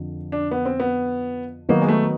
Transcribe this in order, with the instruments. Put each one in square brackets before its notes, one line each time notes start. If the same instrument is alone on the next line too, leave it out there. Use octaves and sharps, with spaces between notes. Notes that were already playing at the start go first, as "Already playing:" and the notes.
Already playing: [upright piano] F2 D3 F3
[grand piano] D4
B3
C4
B3
[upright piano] D#3 F#3 B3 D#4 F#4 [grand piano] A#3
[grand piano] G#3
A3